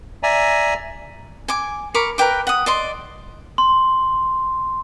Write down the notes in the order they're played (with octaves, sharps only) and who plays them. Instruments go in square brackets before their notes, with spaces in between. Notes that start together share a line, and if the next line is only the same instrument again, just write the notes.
[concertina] D5 E5 G#5 A#5
[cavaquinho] G#5 D6
A#4 B5 C#6 D6
A#4 B4 G5 D6
F#5 D#6
D5 D#5 C6
[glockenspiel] C6